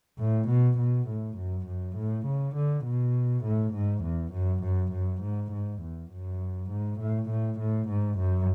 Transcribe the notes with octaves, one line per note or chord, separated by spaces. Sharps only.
A2
B2
B2
A2
F#2
F#2
A2
C#3
D3
B2
A2
G#2
E2
F#2
F#2
F#2
G#2
G#2
E2
F#2
G#2
A2
A2
A2
G#2
F#2